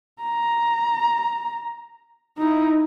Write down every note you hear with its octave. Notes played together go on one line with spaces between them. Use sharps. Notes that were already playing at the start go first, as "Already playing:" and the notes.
A#5
D#4 E4